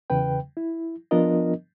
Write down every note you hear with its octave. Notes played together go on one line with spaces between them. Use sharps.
E2 C#3 B4 G5
E4
F3 B3 D4 F4 A#4 D#5